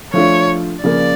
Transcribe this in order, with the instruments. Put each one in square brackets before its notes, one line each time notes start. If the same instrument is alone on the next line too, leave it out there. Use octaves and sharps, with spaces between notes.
[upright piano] F3 A3 D4 F4 [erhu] C#5
[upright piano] C#3 F3 A#3 [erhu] D5